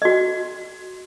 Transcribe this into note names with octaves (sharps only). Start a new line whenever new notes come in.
F#4 D#5